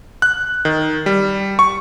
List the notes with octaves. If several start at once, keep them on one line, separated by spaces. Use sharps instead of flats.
F#6
D#3
G3
C#6